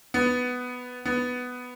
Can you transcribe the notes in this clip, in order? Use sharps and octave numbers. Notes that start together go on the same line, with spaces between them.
B3
B3